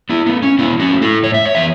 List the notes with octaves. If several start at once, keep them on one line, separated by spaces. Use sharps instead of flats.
B3 E4
A3 B3
C#4
B2 B3 E4
C#4 F#4
A3
E4 A4
A2 C#5
E5
C#5
E3 B3 E5